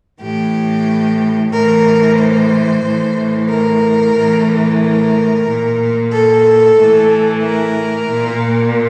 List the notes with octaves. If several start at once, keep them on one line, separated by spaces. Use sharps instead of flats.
A2 E3 G4
A2 E3 A#4
C5
A2 E3
A#4
A2 E3
A#4
A#2
A4
A2 E3
A#4
A#2